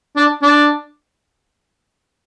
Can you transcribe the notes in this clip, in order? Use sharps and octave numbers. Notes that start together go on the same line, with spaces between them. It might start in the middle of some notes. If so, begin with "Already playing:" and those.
D4
D4